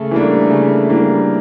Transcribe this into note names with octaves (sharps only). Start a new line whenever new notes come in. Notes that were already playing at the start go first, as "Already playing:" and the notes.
Already playing: C#3 A3
E3 G3 A#3 D4
C#3
E3 G3 A#3 D4